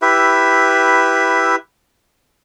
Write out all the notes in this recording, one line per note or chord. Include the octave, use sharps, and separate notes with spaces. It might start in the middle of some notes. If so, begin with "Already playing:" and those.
E4 G4 B4 E5